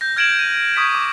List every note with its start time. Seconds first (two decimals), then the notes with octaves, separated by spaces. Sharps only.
0.01 G6 A#6
0.16 F6 G#6 D7 E7 F#7
0.39 D#7
0.76 C#6 D#6 G#6 B6
0.95 D6